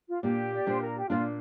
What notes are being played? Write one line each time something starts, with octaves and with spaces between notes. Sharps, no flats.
F4
A#2 A#3 D4 G4
D5
A#2 A#3 D4 C5
A#4
G4
A#2 A#3 D4 F4